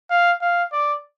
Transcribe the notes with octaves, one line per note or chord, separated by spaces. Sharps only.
F5
F5
D5